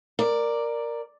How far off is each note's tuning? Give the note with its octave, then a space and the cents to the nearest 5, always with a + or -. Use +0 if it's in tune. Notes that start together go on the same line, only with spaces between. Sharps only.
A#4 +0 D5 +5